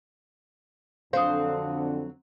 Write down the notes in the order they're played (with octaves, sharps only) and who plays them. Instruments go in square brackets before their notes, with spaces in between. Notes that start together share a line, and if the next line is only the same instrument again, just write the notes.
[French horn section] F2 D3 [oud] F#3 C4 C5 [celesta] F5 D#6